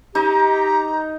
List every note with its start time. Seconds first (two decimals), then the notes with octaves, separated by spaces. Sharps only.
0.15 D#4 G4 A#5